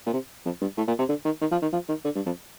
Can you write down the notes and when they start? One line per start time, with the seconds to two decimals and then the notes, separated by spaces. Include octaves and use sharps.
0.06 A#2
0.13 C3
0.45 F2
0.61 G2
0.77 A2
0.88 A#2
0.99 C3
1.09 D3
1.25 D#3
1.41 D#3
1.52 F3
1.62 D#3
1.73 F3
1.89 D#3
2.05 D3
2.16 G2
2.26 F2